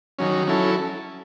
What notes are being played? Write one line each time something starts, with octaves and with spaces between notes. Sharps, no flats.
D#3 F#3 C#4
F#3 C#4 E4 A4